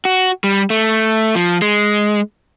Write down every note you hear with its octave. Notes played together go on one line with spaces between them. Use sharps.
F#4
G3
A3
F3
G#3